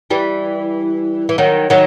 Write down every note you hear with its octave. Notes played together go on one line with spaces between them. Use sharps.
E3 G3
E3
D#3 F#3
D#3 F#3